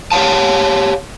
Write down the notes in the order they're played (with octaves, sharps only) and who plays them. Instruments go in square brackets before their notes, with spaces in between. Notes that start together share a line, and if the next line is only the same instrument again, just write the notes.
[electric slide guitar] G4 C#5 D#5 F5 A5